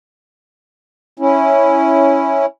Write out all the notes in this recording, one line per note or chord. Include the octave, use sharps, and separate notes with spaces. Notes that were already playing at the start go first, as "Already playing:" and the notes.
C#4 E4